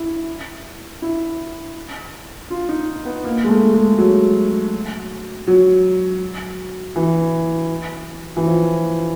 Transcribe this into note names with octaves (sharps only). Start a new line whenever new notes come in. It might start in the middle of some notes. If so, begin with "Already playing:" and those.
Already playing: E4
E4
F4
D#4
B3
A#3
G#3
A3
G#3
F#3
F#3
E3
E3
F3